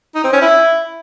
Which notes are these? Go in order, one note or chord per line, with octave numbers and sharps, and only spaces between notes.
D#4
C4
C#4
E4